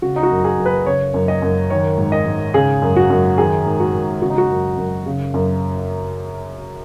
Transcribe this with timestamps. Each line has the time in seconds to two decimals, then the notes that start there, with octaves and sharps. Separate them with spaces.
0.02 C#3 F#4
0.16 D#4
0.23 F#4
0.31 F#2
0.44 G#4
0.58 F#2
0.66 B4
0.86 C#3 C#5
1.14 F#2
1.28 D#5
1.42 F#2
1.70 D#3 C#5
1.98 G#2
2.12 D#5
2.26 G#2
2.54 C#3 G#4
2.82 F#2
2.96 F#4
3.10 F#2
3.38 D#3 G#4
3.66 G#2
3.80 F#4
3.94 G#2
4.22 C#3 F#4
4.30 D#4
4.38 F#4
4.50 F#2
4.77 F#2
5.06 C#3
5.34 F#2